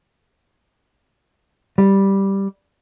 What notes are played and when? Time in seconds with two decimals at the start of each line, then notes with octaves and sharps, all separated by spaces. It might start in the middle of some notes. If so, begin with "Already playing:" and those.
1.78 G3